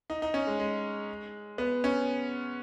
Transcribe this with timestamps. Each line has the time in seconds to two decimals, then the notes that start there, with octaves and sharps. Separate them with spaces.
0.10 D#4
0.22 D#4
0.34 C#4
0.47 G#3
0.60 G#3
1.58 B3
1.84 C#4